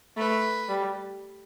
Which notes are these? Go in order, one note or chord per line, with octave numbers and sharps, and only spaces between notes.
A3 B4
G3